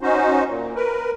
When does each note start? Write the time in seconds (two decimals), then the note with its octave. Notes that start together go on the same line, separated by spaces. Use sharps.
0.01 C#4 D#4 F#4 C5
0.47 A#2
0.76 A#4 B4